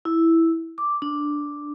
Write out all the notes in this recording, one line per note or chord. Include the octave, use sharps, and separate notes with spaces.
E4
D6
D4